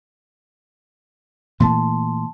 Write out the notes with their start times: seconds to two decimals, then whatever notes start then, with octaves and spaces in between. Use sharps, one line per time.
1.60 A#2 E3 A3 A5 C6